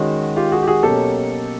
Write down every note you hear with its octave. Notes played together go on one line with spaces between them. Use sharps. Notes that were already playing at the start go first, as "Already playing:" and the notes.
Already playing: D#3 G#3 C#4 F#4
F4 G4
F#4 G#4
G4
F#4 G#4
B2 F#3 A#3 C#4 G4 A4